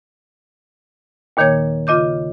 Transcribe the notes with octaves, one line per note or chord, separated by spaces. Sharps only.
D#2 A#2 D#3 A#3 C#5 G#6
C#3 F4 D#5 D6 G6